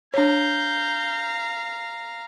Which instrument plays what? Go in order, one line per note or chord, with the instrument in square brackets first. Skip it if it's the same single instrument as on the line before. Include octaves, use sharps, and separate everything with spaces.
[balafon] D4 C#5 [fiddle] F5 A#5 [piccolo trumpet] G6